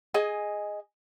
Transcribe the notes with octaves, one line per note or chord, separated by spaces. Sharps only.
G#4 D#5 G#5